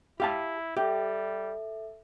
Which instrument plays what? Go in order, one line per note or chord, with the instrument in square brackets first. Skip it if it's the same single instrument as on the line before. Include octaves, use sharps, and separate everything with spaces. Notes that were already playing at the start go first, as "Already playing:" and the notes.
[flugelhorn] E4 [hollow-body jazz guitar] G4 F5 A5
[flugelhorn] G3 [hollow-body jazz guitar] G4 [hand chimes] A4 E5